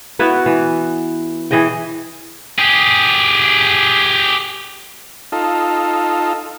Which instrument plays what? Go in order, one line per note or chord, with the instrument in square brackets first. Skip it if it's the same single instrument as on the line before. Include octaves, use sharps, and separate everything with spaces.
[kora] B3 E4 F#4 B4
E3
E3 G#4 D#5 G5
[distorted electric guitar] G4 G#4
[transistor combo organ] D#4 F4 A4